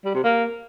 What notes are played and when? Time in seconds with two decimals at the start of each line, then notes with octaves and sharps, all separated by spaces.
0.05 G3
0.14 C3
0.24 A#3